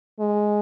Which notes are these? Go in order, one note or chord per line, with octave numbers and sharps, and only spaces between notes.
G#3